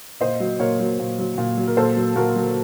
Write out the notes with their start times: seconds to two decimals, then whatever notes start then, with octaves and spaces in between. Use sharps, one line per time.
0.20 A#2 C5 D#5
0.40 F#3
0.59 A#2 A#4 C#5
0.80 F#3
0.99 A#2
1.19 F#3
1.38 A#2
1.58 F#3
1.68 A#4
1.77 A#2 A4 C5
1.97 F#3
2.16 A#2 F#4 A#4
2.36 F#3